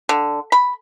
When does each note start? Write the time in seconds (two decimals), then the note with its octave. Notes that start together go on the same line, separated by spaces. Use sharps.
0.09 D3
0.52 B5